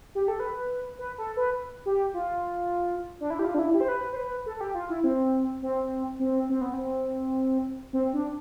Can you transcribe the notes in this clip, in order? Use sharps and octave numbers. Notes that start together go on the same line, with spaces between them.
G4
A4
B4
B4
A4
B4
G4
F4
D4
E4
G4
F4
D4
E4
G4
C5
B4
C5
B4
A4
A4
G4
F4
E4
C4
C4
C4
C4
B3
C4
C4
D4